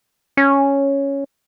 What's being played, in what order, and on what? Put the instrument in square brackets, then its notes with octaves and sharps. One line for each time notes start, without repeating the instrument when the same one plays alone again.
[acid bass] C#4